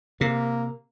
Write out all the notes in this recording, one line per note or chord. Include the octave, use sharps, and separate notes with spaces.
C3 A#3